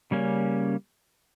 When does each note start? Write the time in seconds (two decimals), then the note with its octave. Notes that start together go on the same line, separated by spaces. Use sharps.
0.11 C#3 G3 A#3 C#4